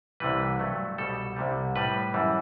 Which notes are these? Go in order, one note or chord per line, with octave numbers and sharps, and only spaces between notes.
C2 C3 E3 G3 B4
G2 F#3 A3
C2 B2 G3 A4
C2 C3 G3
A2 G3 B4
F#2 E3 G3